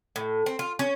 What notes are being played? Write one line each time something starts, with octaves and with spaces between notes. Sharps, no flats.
A2
C4
F4
C#4